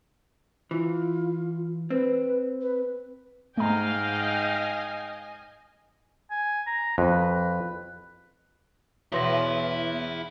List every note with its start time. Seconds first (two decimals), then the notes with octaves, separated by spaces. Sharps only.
0.71 E3 F4
1.90 C4 B4
2.61 B4
3.58 G#2 A3 D#5 F5 G5 G#5 A#5
6.31 G#5
6.67 A#5
6.98 F2 B4
9.12 E2 B2 B3 E4 F#4 C#5 C6 A#6